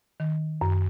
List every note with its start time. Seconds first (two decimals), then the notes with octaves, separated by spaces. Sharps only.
0.20 D#3
0.61 F#2